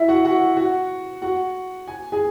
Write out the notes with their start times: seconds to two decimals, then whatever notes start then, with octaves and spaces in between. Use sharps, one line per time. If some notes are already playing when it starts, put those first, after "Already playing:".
Already playing: E4 E5
0.08 F#4 F#5
0.25 F#4 F#5
0.57 F#4 F#5
1.22 F#4 F#5
1.88 G#5
2.12 G#4 G#5